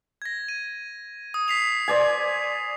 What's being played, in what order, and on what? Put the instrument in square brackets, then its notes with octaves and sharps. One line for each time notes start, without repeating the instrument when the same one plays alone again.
[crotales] G#6 A#6
D#7
D#6
B6 C7 F7
[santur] C5 D5 G#5